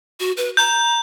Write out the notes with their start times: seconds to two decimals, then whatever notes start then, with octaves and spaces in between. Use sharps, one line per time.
0.20 F#4
0.37 B4
0.57 A#5 G6